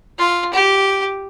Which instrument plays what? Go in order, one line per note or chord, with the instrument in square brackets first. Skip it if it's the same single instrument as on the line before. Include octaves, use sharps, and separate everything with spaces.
[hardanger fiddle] F4
G4